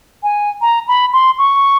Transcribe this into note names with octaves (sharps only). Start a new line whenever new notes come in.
G#5
A#5
B5
C6
C#6